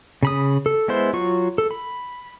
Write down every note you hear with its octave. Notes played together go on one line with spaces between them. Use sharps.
C#3 B5 D#6
A4
G#3 B3 E4 C5 C6
F#3 F4 C#6
A4
B5